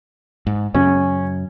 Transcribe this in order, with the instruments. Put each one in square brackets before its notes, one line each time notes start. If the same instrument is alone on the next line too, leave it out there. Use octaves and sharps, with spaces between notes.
[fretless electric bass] G#2
[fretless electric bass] F#2 C#3 [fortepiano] C#4